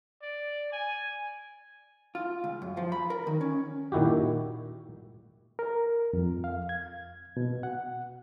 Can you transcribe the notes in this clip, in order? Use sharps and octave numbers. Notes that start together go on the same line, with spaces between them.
D5
G#5
F4
C#2
F#2
F3
B5
A#4
D#3
C#4
A#2 D#3 E4 F#4 G4
A#4
F2
F5
G#6
B2
F#5